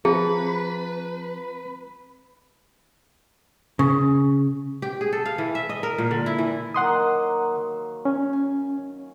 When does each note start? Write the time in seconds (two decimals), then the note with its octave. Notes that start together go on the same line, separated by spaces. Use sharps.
0.05 F3 C4 G#4 B4 A#5
3.79 C#3
4.82 G4
5.01 G#4
5.13 A4
5.26 F5
5.38 E3
5.55 E5
5.69 D#5
5.83 A#4
5.98 A#2
6.11 D3
6.26 E4
6.38 E3
6.74 D#3 F#3 A#3 F#5 C6 D#6
8.05 C#4
8.33 G#5